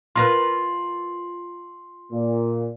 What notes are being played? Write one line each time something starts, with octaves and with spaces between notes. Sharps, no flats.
F4 A#4 B4 C6
A#2